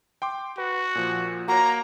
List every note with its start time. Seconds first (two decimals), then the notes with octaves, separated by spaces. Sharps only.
0.22 G5 C6 D6
0.58 F#4 B4
0.95 A#2 F3
1.48 A#3 F#4 C#5 A#5